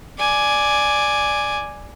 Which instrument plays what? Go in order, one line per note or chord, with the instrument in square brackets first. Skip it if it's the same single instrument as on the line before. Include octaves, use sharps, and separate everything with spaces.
[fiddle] D5 G#5